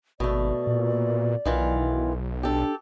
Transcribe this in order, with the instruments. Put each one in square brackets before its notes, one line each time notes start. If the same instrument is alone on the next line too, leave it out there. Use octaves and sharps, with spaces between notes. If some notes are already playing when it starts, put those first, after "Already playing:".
[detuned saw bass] G#1 [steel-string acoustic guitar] B2 A3 [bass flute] D5
[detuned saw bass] A#2
[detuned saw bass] B1 [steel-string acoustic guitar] D#3 E3 F4
[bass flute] D4 [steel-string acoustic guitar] G4 A4